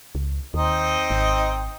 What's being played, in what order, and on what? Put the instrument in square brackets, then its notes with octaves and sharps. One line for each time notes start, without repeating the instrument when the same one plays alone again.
[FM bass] C#2
[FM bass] D#2 [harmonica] C4 D#4 D#5
[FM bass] G#1